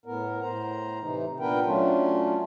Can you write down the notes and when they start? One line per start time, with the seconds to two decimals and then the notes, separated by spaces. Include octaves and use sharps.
0.06 A2 B3 A#4
0.42 A2 C5 A#5
1.02 C3 E3 D#4
1.40 A#2 B3 D4 A#4 B4 G5
1.65 F#3 A3 C#4 D4 F4